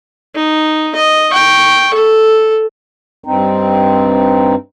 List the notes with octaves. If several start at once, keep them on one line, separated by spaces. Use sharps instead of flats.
D#4
D#5
G5 C#6
A4
G2 C4 D#4